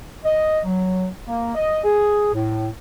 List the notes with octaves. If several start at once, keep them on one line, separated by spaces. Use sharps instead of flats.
D#5
F#3
A#3
D#5
G#4
A2